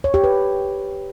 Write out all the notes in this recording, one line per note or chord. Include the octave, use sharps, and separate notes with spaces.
C#5
G4
B4